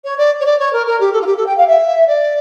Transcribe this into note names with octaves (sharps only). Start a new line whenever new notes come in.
C#5
D5
C#5
D5
C#5
A#4
A#4
G4
A4
F4
G4
A4
G5
F5
E5
D5